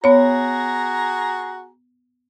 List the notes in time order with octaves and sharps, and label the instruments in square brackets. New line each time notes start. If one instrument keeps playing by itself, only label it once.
[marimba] B3 C#5 [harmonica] F#4 G#4 A#5